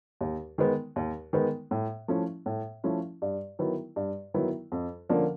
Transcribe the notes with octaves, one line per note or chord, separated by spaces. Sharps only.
D#2
D#3 G#3 B3
D#2
D#3 G#3 B3
A2
F3 A3 C#4 E4
A2
F3 A3 C#4 E4
G2
D#3 F#3 B3 E4
G2
D#3 F#3 B3 E4
F2
D3 F3 A#3 C#4